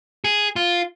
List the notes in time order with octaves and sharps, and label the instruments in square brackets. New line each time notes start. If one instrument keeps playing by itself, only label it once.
[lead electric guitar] G#4
F4